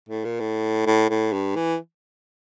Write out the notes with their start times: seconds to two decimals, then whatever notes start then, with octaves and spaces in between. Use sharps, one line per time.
0.09 A2
0.25 A#2
0.40 A2
0.86 A2
1.10 A2
1.33 G2
1.56 E3